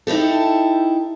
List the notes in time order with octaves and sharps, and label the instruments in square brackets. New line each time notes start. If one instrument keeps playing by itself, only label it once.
[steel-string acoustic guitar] D#4 E4 G4 A4